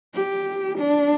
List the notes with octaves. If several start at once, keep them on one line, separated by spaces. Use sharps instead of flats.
G4
D4